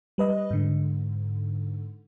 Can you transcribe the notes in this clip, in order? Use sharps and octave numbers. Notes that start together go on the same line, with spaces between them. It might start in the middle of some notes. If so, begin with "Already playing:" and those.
G3 B4 D#5
G#2 D3